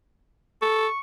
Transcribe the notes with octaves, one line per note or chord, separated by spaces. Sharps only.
A4 C#6